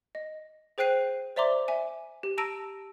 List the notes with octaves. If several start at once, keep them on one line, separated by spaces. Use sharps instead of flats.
D#5
G#4 C5 G5 F#6 C7 D#7
C5 D5 E5 A#5 C6 D6
E5 G#5
G4
A5 A#5 E6 A#6 D7 D#7